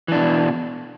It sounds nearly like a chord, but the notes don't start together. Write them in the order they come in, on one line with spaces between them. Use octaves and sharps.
E3 D4 B2